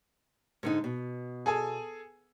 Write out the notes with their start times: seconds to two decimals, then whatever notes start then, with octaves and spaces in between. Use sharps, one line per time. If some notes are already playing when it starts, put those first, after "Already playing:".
0.63 G#2 D3 D#4
0.84 B2
1.46 G#4 A4 G#5